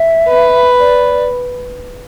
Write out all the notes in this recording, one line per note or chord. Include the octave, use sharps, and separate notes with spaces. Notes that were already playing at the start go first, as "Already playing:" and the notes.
Already playing: E5
B4
D5